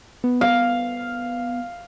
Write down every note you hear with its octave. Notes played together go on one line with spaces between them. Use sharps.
B3
F5